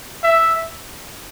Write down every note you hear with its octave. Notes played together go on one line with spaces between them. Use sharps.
E5